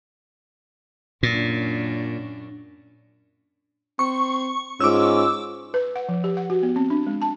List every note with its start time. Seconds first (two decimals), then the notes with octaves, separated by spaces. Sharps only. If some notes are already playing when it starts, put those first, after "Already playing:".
1.23 F#2 A#2 C#4 D4
3.99 C4 C#6
4.80 G#2 C#4 F4 D6 E6
5.74 B4
5.96 F#5
6.09 F3
6.24 G4
6.37 F#5
6.50 F#4
6.63 B3
6.76 C4
6.90 D4
7.07 G#3
7.22 A5